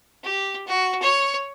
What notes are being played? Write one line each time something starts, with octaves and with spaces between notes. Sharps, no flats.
G4
F#4
C#5